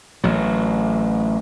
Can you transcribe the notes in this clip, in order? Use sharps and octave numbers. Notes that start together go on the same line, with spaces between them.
A1 F#3